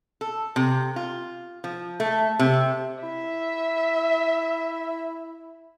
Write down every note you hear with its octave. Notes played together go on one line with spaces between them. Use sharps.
A4
C3
F4
F3
A3
C3
E4 E5